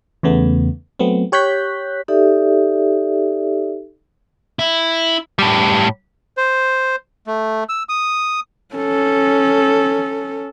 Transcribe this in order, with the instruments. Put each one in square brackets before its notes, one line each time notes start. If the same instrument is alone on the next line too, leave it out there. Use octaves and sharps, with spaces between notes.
[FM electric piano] E2 C#3 A3 B3
F#3 A3 B3 C4
G4 C#5 F#6 G6 B6
[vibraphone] D#4 G4 A4 D5 E5
[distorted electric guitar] E4
[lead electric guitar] A2 G3
[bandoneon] C5
A3
E6
D#6
[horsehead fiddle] C#4 A4